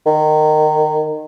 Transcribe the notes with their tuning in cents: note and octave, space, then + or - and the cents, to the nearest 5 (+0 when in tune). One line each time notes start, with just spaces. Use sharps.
D#3 -20